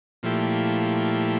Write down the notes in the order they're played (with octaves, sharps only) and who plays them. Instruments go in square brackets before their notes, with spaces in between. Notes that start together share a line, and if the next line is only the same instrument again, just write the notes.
[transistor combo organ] A#2 F3 A3 E4 G4